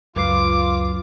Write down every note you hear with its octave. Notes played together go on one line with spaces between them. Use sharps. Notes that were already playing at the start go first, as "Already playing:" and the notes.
C#2 F#2 F4 B4 D6 C7